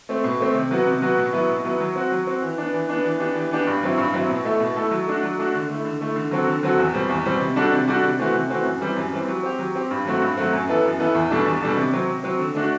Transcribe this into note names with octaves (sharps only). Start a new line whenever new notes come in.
A3 C4
B2
A3 C4
C3
F#3 B3 F#4
C3
F#3 B3 F#4
B2
F#3 B3 E4
B2
F#3 B3 E4
F#3
C4 F#4
F#3
C4 F#4
E3
B3 D4
E3
B3 D4
E3
B3 D4 G4
E3
B3 D4 G4
G2
F#3 C4 E4
G2
F#3 C4 E4
B2
A3 E4 A4
B2
A3 E4 A4
F#3
A3 D4 F#4
F#3
A3 D4 F#4
D3
A3 E4
D3
A3 E4
D3
F#3 C4 F#4 A4
D3
F#3 C4 F#4 A4
E2
B2 G3 C4
E2
B2 G3 C4
C3
G3 D4 F#4 A4
C3
G3 D4 F#4 A4
C3
E3 A3 C4 F#4
C3
E3 A3 C4 F#4
F#2
E3 G3 C4
F#2
E3 G3 C4
F#3
C4 G4
F#3
C4 G4
G2
F#3 A3 C4 F#4
G2
F#3 A3 C4 F#4
F#2
E3 B3 E4 A4
F#2
E3 B3 E4 A4
E2
B2 G3 D4 A4
E2
B2 G3 D4 A4
C3
F#3 C4
C3
F#3 C4
D3
A3 D4 F#4